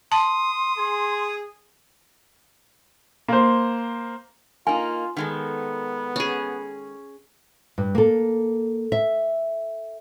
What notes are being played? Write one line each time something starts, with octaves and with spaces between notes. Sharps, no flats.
A5 C6 D#6
G#4
A#3 C5
A#3 D#4 F4 G#5
D#3 G#3 B3 A4
C#4 G#4
G2
A#3 A4
E5